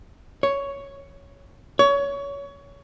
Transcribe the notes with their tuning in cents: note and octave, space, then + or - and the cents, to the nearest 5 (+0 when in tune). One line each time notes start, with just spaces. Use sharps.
C#5 +5
C#5 +25